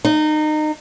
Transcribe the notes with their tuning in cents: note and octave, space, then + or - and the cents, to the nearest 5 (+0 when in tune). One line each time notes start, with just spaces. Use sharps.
D#4 -25